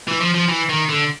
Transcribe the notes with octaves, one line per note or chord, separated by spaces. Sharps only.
E3
F3
F3
E3
D#3
D3